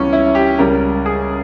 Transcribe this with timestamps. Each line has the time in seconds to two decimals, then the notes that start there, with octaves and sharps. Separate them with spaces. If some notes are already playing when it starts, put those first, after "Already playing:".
Already playing: C#2 C#3 E3 G3 C#4
0.13 E4
0.35 G4
0.58 C#2 C#3 G3 A#4
1.06 G#4